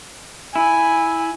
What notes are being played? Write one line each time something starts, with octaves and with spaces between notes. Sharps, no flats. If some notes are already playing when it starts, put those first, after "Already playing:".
E4 G#5